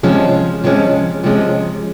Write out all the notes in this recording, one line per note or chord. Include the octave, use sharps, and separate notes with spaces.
C3 F3 G#3 C#4
C3 F3 G#3 C#4
C3 F3 G#3 C#4